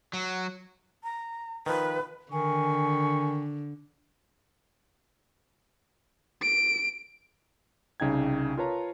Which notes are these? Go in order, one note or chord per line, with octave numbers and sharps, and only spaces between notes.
F#3
A#5
D#3 F3 B4
D3 D#3 G#5 C#6
D7
C2 C#3 D#4 G5 G#6
F4 A#4 B4 C#5 A5 A#5